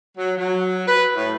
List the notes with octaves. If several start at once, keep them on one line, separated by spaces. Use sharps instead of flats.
F#3
F#3
B4
A2